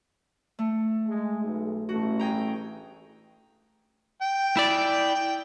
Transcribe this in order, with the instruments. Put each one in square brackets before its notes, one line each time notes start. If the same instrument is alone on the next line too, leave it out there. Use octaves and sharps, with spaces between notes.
[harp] A3
[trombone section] G#3
B1
[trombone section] A1 G2 A3 [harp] F#4
[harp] G#4 G5 A#5
[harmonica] G5
[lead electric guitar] E4 D5